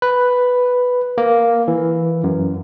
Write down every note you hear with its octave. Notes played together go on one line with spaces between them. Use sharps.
B4
A#3
E3
F#2